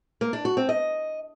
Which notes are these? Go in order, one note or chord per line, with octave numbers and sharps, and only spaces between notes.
A#3
D4
F#4
C4
D#5